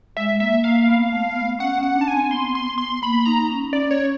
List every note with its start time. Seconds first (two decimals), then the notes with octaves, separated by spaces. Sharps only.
0.17 G#3 E5
0.40 A#3 E5
0.64 A#3 F5
0.88 B3
1.12 A3
1.36 B3
1.59 C#4 F#5
1.78 C#4 F#5
1.96 D4
2.01 A5
2.08 G#5
2.13 C4
2.31 B3 C6
2.55 C6
2.78 C6
3.02 A#3 B5
3.25 D#4 A#5
3.50 C#4
3.73 D5
3.91 C#5